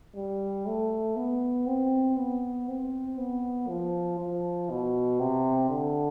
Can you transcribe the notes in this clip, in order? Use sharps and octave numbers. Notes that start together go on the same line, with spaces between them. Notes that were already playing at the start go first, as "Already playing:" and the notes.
G3
A3
B3
C4
B3
C4
B3
F3
F3
B2
C3
D3